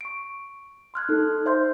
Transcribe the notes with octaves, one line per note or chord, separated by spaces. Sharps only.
C#6 D7
C6 F6 F#6 G#6
D#4 A4
C5 E5 C6 G6